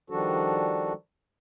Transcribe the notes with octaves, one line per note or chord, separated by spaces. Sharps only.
D#3 F3 G3 D4 F#4 A4